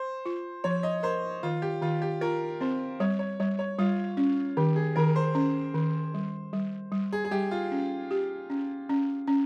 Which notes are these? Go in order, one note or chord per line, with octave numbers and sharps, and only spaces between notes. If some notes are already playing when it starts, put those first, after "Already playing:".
Already playing: C5
F4
F3 C#5
D#5
A#4 C5
D#3 F4
G4
D#3 F4
G4
F4 A#4
C4 C5
G3 C#5
C#5
G3 C#5
C#5
G3 F4
C#4
D#3 G4
G#4
D#3 A#4
C5
C#4
D#3
G3
G3
G3
G#4
G#4
G3 G4
F4
C#4
G4
C#4
C#4
C#4